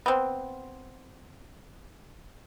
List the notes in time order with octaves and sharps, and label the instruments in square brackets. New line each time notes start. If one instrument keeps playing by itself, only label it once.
[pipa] B3 C4